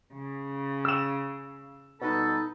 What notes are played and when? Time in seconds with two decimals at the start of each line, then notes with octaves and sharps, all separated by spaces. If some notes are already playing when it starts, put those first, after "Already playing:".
0.13 C#3
0.85 E6 E7
2.02 B2 G3 D#4 A4 B4